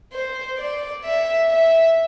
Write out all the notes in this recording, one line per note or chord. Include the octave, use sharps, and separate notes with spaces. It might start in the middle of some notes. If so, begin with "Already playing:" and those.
C5
D5
E5
E5